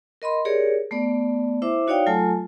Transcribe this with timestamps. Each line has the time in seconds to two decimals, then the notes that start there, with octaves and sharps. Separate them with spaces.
0.22 A#4 D#5 B5 C6
0.45 G4 G#4 A#4 C#5 D5
0.91 A3 B3 D5
1.62 E4 C5 E5 D6
1.87 D#4 F#4 C#5 D5 F5 G5
2.06 F#3 A3 F4 A4 G#5 A5